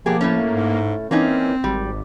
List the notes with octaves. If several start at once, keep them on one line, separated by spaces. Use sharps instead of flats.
B2 F3 A#3 G4 G#4
A2 A3 C#4
G#2
E3 A#3 C4 C#4 D#4
G#1 G3